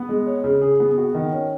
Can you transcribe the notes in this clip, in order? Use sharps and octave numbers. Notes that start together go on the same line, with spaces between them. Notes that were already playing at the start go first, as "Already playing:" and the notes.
Already playing: B3
G#3
C#5
C#3
G#4
B3
F#4
D#3
C#4